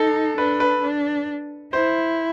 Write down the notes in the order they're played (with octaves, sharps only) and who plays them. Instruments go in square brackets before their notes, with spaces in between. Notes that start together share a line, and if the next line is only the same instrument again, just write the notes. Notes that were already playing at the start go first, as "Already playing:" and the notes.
Already playing: [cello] D#4 [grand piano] A4
[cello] D4 [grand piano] B4
[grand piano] B4
[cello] D4
[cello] E4 [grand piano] C5